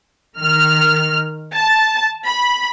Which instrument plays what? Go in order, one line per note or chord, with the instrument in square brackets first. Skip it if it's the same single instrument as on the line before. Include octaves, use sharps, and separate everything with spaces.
[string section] D#3 F6
A5
B5